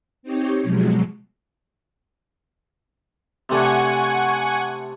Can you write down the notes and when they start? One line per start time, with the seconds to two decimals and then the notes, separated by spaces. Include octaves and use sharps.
0.23 C4 D#4 G4 C#5
0.63 B2 F3 F#3 G#3
3.50 C3 A3 D4 F#5 G#5 C#6